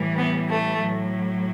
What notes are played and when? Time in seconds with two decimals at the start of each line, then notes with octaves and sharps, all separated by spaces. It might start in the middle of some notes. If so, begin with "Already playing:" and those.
Already playing: A2 E3 G3
0.18 B3
0.49 A3
0.82 A2 F#3